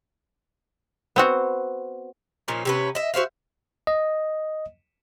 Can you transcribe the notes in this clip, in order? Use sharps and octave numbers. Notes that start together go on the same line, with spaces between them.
B3 C4 F#4
A#2 F3 C#4 D#4
C3 C#4 B4
D#5 E5
F#4 C5 E5 F5
D#5